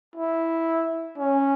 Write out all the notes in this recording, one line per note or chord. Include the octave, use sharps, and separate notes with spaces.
E4
C#4